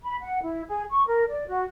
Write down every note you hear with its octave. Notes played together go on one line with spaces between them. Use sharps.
B5
F#5
E4
G#4
C#6
A#4
D5
F#4